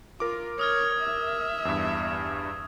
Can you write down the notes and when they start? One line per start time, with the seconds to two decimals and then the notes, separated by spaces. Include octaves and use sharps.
0.20 F4 A#4 D6
0.59 C#5 D#6 F6 G#6
1.01 E5
1.65 E2 G2